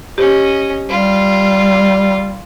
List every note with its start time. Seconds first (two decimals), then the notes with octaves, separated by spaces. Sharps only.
0.18 C#4 G4 D#5
0.89 G3 F4